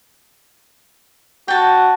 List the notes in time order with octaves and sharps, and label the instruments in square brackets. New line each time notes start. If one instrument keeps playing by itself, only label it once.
[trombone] F#4 [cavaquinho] G5 A5